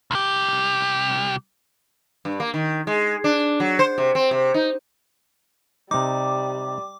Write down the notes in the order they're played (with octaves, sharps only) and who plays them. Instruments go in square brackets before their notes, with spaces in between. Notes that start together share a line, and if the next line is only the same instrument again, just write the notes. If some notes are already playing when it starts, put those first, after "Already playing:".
[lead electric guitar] C2 G4
[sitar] G2
A#3
D#3
G#3
D4
F#3
C5
C3
C4
C3
D#4
[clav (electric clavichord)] C3 D#4 [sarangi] G3 [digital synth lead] D6